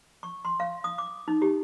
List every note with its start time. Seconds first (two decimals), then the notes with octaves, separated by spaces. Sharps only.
0.23 C#6
0.45 C6
0.60 F5
0.84 D#6
0.98 D6
1.28 D#4
1.42 G4